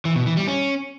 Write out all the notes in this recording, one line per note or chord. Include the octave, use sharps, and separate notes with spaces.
E3
B2
E3
G3
C#4